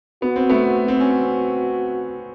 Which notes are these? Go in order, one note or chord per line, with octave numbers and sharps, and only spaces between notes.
B3 F#4
C4
A3 B3
C4 F#4
C#4